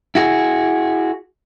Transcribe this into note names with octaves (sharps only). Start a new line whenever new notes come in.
E4 F#4 G#4